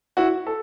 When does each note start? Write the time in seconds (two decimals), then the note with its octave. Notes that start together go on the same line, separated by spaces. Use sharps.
0.17 E4 F#4
0.47 A4